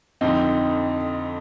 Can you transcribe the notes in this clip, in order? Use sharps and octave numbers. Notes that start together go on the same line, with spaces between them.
F2 D3 C4 D#4